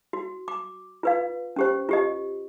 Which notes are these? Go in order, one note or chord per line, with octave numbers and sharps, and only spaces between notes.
F#4
D6
F4 B4 F5
C#4 G4 C5
F4 G4 D#5